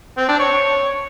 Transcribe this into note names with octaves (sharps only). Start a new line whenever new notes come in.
C4
D4
C#5